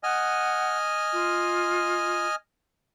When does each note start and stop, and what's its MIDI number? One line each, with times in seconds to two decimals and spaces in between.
0.03 2.35 75
0.03 0.77 78
0.03 2.35 80
0.03 2.35 89
1.13 2.26 65